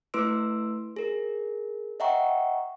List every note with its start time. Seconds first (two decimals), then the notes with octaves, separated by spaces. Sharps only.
0.14 A3 E4 B4 C6 E6 D7
0.96 G#4 A#4
2.00 D#5 E5 F#5 G5 A#5 C#6